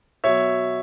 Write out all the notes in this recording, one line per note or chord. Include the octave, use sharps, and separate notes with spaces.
B2 F#3 C#5 E5